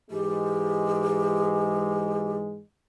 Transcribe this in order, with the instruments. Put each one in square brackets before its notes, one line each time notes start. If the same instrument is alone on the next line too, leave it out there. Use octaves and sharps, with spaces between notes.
[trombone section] G#2 E3 G#3 [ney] G4